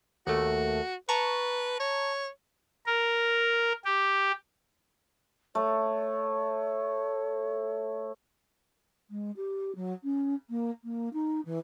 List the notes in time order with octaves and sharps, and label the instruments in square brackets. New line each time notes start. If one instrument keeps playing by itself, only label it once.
[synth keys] D#2 A3 [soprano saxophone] F#4
[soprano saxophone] B4 [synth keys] A5 A#5 C#6
[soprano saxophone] C#5
[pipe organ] A#4
G4
[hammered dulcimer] A3 [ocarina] C#5
[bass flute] G#3
G4
F#3
C#4
A#3
A#3
D#4
E3